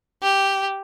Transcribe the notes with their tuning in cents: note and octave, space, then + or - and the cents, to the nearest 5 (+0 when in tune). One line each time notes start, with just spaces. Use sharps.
G4 -5